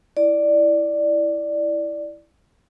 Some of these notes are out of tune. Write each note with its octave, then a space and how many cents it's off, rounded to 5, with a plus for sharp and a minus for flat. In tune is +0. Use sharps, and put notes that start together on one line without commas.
E4 +0 D5 +5